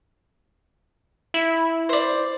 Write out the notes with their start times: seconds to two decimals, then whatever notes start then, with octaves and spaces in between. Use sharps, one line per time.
1.34 E4
1.89 C5 D5